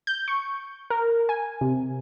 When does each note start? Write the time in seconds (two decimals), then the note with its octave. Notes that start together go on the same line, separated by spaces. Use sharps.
0.07 G6
0.28 C#6
0.90 A#4
1.29 G#5
1.61 C3